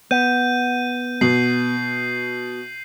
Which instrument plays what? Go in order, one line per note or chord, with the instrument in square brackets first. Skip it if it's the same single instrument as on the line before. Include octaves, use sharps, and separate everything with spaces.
[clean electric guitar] B3 [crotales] G6 D#7
[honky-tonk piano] B2 [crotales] C7 F#7